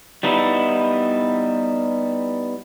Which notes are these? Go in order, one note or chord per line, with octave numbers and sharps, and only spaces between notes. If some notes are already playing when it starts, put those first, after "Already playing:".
G3 B3 D#4 E4